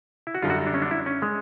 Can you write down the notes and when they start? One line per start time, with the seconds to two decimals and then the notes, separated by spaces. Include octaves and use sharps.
0.27 E4
0.35 F#4
0.42 F#2 D3 G3 F4
0.50 F#4
0.67 D4
0.74 C#4
0.82 D4
0.91 E4
1.06 C#4
1.22 G#3